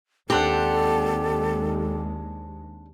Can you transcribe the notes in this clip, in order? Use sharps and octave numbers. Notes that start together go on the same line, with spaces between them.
D#2 G#3 C4 D4 G4 A4 F#5